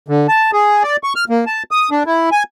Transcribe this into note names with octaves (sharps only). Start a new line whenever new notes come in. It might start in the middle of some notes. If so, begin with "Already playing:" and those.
D3
A5
G#4
D5
C#6
F6
A#3
A5
D#6
D4
E4
G#5